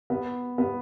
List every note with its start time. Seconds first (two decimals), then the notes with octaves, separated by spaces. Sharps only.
0.10 B3
0.58 B3